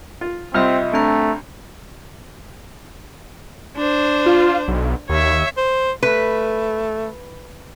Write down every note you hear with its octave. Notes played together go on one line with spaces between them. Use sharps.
F4
C2 C4 F4 D#5 E5 F6
A3 C4 D4 A#5
D4 C5
F4
B1
D#2 C#5 E5
C5
A3 B4